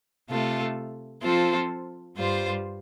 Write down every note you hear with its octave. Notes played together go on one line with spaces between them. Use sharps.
C3 A3 F4 A4
F3 C4 F4 A4 C5
G2 G3 F4 C5